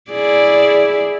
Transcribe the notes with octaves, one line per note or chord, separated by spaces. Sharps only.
E4 G#4 D5